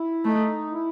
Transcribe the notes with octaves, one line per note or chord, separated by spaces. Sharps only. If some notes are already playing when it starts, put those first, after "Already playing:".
Already playing: E4
A3 D#4
E4